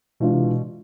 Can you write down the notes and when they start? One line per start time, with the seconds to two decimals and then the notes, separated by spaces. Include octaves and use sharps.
0.20 B2 E3 G#3 D4 F4
0.32 C3
0.43 B2